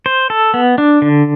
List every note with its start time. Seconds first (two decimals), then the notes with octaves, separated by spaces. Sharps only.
0.06 C5
0.30 A4
0.54 B3
0.78 D4
1.02 D3